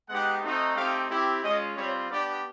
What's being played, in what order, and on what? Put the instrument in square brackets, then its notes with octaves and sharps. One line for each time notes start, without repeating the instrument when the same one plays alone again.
[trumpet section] G#3 B3 D#4 G4 F#5
A3 C4 D#4 F#4
A3 C4 D#4 G4 F5
C4 E4 G4
G#3 C#4 F4 D#5
G3 C4 F4 C#5
B3 D4 G4 D5